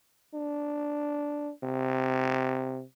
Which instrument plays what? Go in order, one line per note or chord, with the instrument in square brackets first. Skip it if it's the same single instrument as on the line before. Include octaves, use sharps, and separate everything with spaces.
[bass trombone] D4
C3